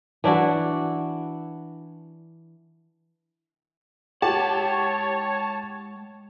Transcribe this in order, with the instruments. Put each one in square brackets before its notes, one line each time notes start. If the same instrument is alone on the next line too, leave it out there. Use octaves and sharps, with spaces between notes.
[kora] E3 D4 E4 F#4
[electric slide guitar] G#3 F#5 [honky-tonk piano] G4 [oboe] C#5 [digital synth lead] A5